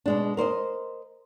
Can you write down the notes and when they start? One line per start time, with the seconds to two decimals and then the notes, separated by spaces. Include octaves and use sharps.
0.06 B2 G#3 D4
0.37 A#4 C5 D5 D#5